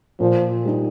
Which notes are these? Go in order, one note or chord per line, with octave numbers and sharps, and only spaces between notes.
A#2 F3
G3 D#4 G4